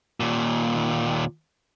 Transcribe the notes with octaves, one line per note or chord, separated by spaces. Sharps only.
D#2 A#2